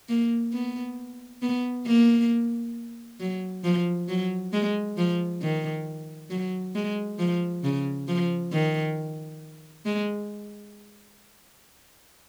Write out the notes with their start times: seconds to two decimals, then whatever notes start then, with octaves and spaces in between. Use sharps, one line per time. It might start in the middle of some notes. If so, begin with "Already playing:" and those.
0.09 A#3
0.53 B3
1.42 B3
1.86 A#3
3.20 F#3
3.64 F3
4.08 F#3
4.53 G#3
4.97 F3
5.42 D#3
6.30 F#3
6.75 G#3
7.19 F3
7.63 C#3
8.08 F3
8.53 D#3
9.85 G#3